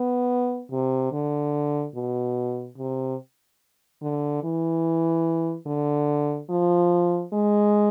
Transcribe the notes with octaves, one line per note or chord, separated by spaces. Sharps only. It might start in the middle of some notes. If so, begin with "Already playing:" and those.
Already playing: B3
C3
D3
B2
C3
D3
E3
D3
F3
G#3